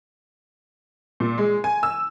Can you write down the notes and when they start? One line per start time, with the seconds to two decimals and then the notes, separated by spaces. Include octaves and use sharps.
1.20 A#2
1.38 G#3
1.64 G#5
1.83 E6